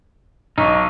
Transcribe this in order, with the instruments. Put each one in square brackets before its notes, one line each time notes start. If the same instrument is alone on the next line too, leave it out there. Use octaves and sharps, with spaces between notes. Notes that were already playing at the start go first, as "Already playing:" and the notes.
[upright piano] B1 [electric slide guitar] D#4 [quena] C#6